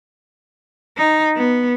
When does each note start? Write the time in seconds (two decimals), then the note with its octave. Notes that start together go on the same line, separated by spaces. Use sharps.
0.97 D#4
1.37 B3